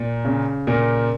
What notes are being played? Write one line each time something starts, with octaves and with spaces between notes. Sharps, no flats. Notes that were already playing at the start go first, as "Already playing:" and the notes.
Already playing: A#2
C#3
A#2 A#4